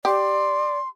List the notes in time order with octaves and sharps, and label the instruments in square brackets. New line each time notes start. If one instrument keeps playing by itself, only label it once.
[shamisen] G4 [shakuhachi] D5 [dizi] C6